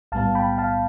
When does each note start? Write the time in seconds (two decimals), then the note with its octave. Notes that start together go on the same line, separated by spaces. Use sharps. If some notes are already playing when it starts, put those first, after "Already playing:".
0.12 B1 A2 G3 B3 F5 A5
0.35 G5 B5
0.58 F5 A5